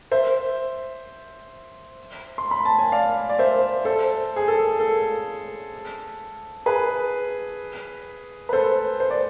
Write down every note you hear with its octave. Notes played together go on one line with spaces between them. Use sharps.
C5 E5
C6
B5
A5
G#5
D5 F5
D5
C5 E5
A4 C5
G#4
A4
A4
G#4 B4
B4
A4 C5
C5
D5